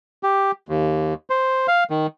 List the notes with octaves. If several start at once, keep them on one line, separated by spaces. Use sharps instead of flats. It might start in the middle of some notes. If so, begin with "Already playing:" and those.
G4
D#2
C5
F5
D#3